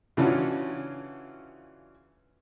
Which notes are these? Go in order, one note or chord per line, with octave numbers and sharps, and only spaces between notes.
C#3 E3 C#4 D4 F4 F#4